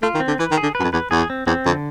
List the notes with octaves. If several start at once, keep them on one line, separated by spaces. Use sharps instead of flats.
A3 F4
D#3
C4
D3
E3 B4
D#3
G#4
D3
F#2 B4
F2
E2 B4
E2 G#4
C4
E2 C4
F2 D3